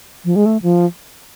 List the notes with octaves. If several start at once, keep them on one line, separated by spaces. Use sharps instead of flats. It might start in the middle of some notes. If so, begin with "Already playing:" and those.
F3
G#3
A3
F3